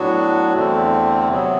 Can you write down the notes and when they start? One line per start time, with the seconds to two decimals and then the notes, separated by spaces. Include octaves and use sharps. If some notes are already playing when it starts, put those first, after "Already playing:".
Already playing: A2 F#3 B3 D4 F#4
0.54 E2 D3 A3 C4
1.28 C3 F#3 B3